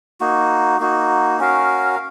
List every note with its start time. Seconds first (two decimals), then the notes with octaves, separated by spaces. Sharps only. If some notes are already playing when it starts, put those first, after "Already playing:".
0.21 A#3 D#4 F#4
0.80 A#3 D#4 F#4
1.39 C#4 F#4 A#4 F5